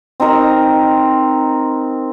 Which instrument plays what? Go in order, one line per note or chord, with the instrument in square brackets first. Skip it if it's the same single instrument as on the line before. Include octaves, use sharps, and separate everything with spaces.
[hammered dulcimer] C4 D#4 A#4 D#5